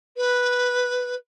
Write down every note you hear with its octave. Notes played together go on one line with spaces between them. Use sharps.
B4